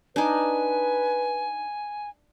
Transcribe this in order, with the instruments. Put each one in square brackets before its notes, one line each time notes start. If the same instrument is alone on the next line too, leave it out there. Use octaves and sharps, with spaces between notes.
[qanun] D4 D#4 [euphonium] B4 [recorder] G#5